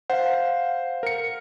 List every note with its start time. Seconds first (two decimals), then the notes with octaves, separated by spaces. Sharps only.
0.10 C5 F5 F#5
1.03 A#4 C#7